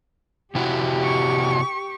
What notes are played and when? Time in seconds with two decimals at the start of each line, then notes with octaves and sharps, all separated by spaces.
0.55 C3 E4 F#4 G4
1.03 C#6